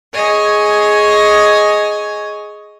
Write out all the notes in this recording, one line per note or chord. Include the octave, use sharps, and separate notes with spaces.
G#4 C#5 D#5 G#5